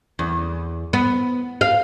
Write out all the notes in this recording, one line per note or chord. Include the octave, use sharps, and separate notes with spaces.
E2
B3
F5